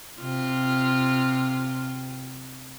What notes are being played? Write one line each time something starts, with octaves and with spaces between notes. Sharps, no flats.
C3 F4